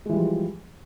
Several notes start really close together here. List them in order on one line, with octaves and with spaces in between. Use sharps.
G#3 E3 G3 F3